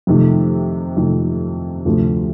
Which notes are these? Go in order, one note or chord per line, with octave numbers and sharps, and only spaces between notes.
F2 C3 D#3 A3
F2 C3 D#3 A3
D2 C3 F3 A3